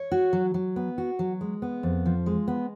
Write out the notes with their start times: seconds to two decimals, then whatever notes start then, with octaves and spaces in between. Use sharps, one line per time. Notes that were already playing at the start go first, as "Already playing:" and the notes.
Already playing: C#5
0.12 F#4
0.33 F#3
0.54 F#3
0.76 B3
0.98 F#4
1.19 F#3
1.41 G#3
1.62 B3
1.83 F2
2.06 F3
2.26 G#3
2.48 B3